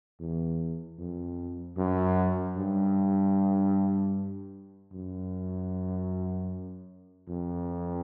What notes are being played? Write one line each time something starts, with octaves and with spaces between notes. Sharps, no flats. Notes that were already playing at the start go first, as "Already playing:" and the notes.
E2
F2
F#2
G2
F#2
F2